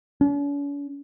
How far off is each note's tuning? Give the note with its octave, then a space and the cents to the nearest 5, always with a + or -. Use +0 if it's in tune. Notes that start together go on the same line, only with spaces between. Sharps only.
C#4 +45